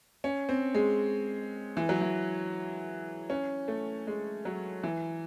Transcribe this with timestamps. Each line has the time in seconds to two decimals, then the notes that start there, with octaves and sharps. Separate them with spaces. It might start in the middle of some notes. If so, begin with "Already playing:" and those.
0.24 C#4
0.49 C4
0.74 G#3
1.77 E3
1.89 F#3
2.01 E3
3.30 C#4
3.68 A3
4.07 G#3
4.45 F#3
4.83 E3